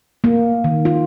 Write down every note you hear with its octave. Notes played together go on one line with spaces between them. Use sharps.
A#3
D#3
F4